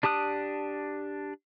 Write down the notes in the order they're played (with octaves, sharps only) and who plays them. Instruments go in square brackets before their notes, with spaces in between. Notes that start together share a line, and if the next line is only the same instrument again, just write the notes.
[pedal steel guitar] D4 G4 A5 D#6 F#6